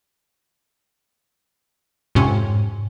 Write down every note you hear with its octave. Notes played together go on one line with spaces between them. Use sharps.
F2 G#2 C3 C#4